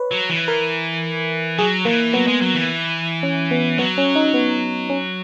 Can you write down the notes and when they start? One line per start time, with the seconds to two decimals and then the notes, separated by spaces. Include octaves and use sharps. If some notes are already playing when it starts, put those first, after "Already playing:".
Already playing: B4 C#5
0.11 F#3
0.29 E3
0.48 A#4
1.58 F#3 G#4
1.85 E3 A#3
2.13 F#3 B3
2.27 G#3
2.41 F#3
2.55 E3
3.23 C#4
3.51 B3
3.79 F#3 B3
3.98 C#4
4.15 D#4
4.34 B3
4.90 C#4